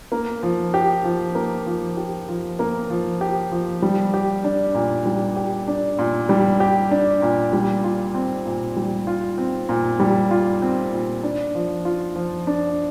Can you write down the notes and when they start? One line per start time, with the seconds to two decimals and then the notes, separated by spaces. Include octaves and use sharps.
0.12 A#3
0.43 F3
0.74 G4
1.04 F3
1.35 A#3
1.66 F3
1.97 G4
2.28 F3
2.59 A#3
2.90 F3
3.21 G4
3.51 F3
3.82 G3
4.14 G4
4.44 D4
4.75 A#2
5.06 G3
5.36 G4
5.68 D4
5.99 A#2
6.29 G3
6.60 G4
6.91 D4
7.22 A#2
7.53 G3
7.84 F4
8.15 C4
8.46 A#2
8.76 G3
9.07 F4
9.38 C4
9.69 A#2
10.00 G3
10.31 F4
10.62 C4
10.92 A#2
11.23 D4
11.55 F3
11.85 F4
12.16 F3
12.47 D4